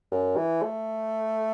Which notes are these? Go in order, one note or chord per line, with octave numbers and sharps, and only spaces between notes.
F#2
E3
A3